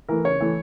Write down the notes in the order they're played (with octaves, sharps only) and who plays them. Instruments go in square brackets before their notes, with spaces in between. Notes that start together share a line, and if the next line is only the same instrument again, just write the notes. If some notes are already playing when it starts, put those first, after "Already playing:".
[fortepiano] E3 A3 A#4
C#3 C#5
E3 A3